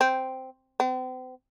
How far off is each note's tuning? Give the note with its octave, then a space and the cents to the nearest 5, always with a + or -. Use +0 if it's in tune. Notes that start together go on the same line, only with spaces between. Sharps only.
C4 -5
C4 -40